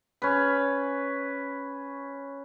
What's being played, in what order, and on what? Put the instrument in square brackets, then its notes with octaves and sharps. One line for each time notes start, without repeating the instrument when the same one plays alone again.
[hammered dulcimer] C#4 B4